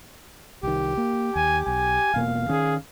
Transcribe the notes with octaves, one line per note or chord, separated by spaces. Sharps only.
C2 D#3 G4
A#3
D#2 G#5
B1 G#5
E1 B2 A#3 F5
D#3 C#4 G#4